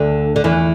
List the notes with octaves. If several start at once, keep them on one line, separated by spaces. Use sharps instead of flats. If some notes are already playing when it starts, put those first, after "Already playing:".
Already playing: D2 D3
D3
E2 E3